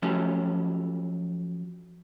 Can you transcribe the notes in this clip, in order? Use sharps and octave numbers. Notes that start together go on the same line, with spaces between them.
F3 F#3 A3 C#4 G4